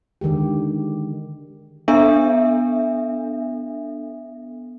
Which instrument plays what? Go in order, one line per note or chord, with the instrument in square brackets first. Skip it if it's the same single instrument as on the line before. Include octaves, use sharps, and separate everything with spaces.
[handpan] D3 D#3 G#3 G4
[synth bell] B3 D4 A4 E5